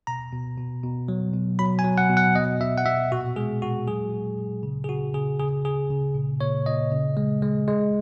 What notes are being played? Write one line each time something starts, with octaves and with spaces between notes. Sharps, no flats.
B2 A#5
B2
B2
B2
F#3
B2
F#3 B5
G#5
F#3
F#5
B2
F#5
B2 D#5
B2 E5
F#5
B2 E5
A#2 F#4
G#3 G#4
A#2 F#4
F#3 G#4
A#2
A#2
C#3
G#4
C#3 F#4
C#3 G#4
C#3 G#4
C#3 G#4
C#3
A#2
A#2 C#5
A#2 D#5
C#3
G#3
G#3
G#3